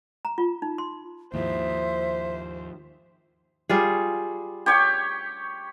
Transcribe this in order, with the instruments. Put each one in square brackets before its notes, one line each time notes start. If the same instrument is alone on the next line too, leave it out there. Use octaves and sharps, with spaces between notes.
[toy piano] A#5
F4
D#4
C6
[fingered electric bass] D#2 [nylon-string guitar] G#2 F3 E4 [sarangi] C5 [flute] E5
[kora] G3 F4 G#4
[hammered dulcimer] G4 C#5 G5